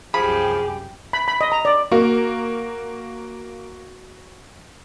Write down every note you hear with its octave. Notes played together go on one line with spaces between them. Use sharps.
C2 F#2 F3 G4 G#4 B5
B5
B5
D#5
A#5
D5
A#3 F#4